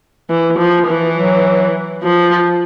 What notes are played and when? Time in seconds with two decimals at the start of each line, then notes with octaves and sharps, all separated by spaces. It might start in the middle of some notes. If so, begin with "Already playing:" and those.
0.30 E3
0.58 F3
0.87 E3
1.17 F#3
2.03 F3